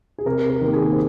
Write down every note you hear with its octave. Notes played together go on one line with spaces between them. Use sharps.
G#4
C3 A#4
A#4
D#3 A#3
G#4
C5